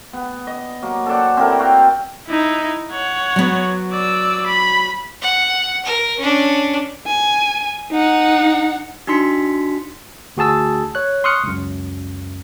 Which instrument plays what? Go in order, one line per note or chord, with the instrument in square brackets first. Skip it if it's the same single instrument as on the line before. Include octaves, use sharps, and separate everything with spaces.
[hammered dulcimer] B3
D#5
F#3 A#3
A4 C5 D5 F#5
C4 E4 A4 A#4
F#4 F5 G5
[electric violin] D#4 E4
C#5 F#5
[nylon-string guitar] F#3 B3
[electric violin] D5 E6
B5
[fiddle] F#5
A#4
C#4 D4
[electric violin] G#5
D#4 F#5
[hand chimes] D4 D#4 F#4 C6 B6 C#7
[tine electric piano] D2 F#4 G#4 A5 E6
C#5 F#6
C6 C#6 D#6 F6 F#6 C#7
C#2 F#2